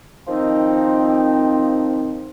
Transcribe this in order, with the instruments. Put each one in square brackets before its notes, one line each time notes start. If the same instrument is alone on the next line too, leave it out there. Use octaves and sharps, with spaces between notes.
[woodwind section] D#3 F3 C4 D#4